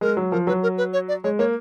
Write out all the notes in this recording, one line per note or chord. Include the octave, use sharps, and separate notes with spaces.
G#3 A#4
F#3
F3 A#4
F#3 B4
A#4
B4
C#5
D5
G#3 C#5
A#3 C#5